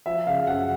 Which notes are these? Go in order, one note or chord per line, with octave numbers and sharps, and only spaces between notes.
F3 E5
C#3 F5
F#2 F#5